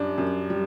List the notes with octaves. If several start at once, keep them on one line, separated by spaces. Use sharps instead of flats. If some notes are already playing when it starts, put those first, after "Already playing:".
Already playing: F#2 G3 D4
F#2
G3